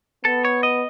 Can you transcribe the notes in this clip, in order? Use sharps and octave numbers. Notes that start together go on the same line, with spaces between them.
B3 A4
C#5
D#5